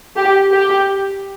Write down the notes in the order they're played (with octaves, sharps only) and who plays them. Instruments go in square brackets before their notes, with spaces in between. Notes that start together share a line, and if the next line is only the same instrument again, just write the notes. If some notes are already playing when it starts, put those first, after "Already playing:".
[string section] G4
G4